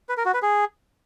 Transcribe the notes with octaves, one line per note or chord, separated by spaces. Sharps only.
B4
A#4
F#4
B4
G#4